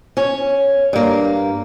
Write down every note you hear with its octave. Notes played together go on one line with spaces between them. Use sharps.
C#4 C#5
G2 A#3